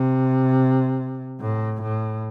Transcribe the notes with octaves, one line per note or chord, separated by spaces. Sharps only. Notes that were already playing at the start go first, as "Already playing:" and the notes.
Already playing: C3
A2
A2